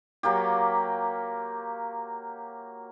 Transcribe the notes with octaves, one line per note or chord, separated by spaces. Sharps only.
F#3 A#3 F4 G4